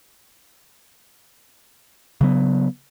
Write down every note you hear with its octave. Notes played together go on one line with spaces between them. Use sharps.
C#3 F#3 B3